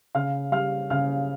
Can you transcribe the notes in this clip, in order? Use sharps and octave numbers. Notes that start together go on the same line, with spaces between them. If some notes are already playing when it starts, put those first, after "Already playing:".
C#3 F5 F6
G3 F5 F6
C#3 F5 F6